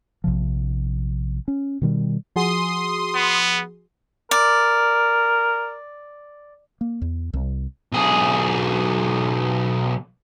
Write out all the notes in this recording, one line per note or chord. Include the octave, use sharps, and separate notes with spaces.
A#1 C3 F3
C#4
B2 D#3 G3
F3 F#4 G#4 C6 D#6
B3
A#4 D5
A#3
E2
C2
B1 G#4